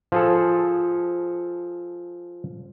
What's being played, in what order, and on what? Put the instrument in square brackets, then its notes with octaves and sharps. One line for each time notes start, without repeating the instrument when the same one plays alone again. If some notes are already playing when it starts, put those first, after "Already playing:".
[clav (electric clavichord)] F3 G#4 A4